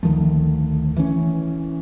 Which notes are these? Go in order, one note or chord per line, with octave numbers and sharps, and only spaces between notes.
D2 D#3 F3 A3
E3 C#4